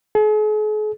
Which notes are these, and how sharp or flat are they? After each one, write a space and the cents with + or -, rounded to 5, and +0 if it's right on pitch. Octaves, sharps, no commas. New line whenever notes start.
G#4 +45